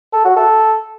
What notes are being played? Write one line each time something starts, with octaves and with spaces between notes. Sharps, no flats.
A4
F#4
A4